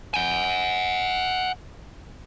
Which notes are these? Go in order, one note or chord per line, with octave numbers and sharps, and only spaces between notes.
F#5 G#5